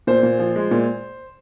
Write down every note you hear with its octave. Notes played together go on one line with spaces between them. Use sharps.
A#2 C5
A#2
F3
G#3
A#2